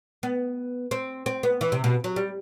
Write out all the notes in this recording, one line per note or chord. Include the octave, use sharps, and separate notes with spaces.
B3
C4
C4
B3
E3
C3
B2
F#3
G3